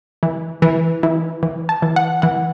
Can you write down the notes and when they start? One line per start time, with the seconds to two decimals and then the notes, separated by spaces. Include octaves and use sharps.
0.23 E3
0.62 E3
1.03 E3
1.43 E3
1.69 A5
1.82 E3
1.96 F#5
2.22 E3 F#5